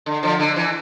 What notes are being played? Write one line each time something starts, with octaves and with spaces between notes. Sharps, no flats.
D3
D3 F3
D3
E3